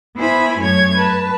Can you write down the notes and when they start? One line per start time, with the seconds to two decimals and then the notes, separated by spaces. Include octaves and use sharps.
0.16 B3 E4 C5 G#5 B5
0.59 F#2 A3 C#5 G#6
0.96 B4 A5